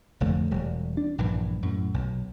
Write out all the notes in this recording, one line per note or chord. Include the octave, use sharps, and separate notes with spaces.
F1 F2 D3 A3
E1 G3
D4
A#1 G2 E3
F#2 A2
B1